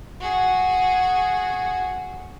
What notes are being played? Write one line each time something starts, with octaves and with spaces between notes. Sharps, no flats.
F#4 G#4